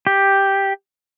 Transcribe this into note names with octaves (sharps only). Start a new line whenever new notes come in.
G4